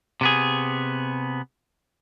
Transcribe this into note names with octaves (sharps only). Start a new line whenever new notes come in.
C3 B3 G#4